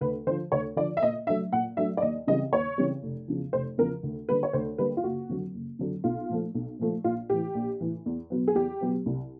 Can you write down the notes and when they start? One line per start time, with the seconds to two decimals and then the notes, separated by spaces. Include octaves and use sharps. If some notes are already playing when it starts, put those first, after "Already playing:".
0.01 D2 B4
0.27 D3 C5
0.30 F3
0.52 D2 C#5
0.76 D3 F3 D5
0.97 E5
1.02 A#2 D#5
1.27 F#3 A3 D4 E5
1.52 A#2 F#5
1.77 F#3 A3 D4 E5
1.97 D5
2.02 D#2 D#5
2.27 C#3 E3 G3 C4 D#5
2.52 D#2 C#5
2.78 C#3 E3 G3 C4
3.03 F1
3.28 E2 C#3 F3
3.53 F1 C5
3.78 E2 C#3 F3 A#4
4.03 D2
4.28 D3 G3 A#3 B4
4.43 C#5
4.53 D2 C5
4.78 D3 G3 A#3 B4
4.97 F4
5.04 F#1 F#4
5.29 F2 D3 F#3
5.54 F#1
5.79 F2 D3 F#3
6.04 B1 F4
6.29 A#2 F3 A3
6.55 B1
6.79 A#2 F3 A3
7.04 A#1 F4
7.30 A2 E3 G4
7.55 A#1
7.81 A2 E3
8.06 E2
8.30 B2 F#3 B3
8.48 G#4
8.55 E2 G4
8.81 B2 F#3 B3
9.06 C2